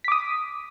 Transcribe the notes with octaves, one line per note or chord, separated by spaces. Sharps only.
D6 D#6 B6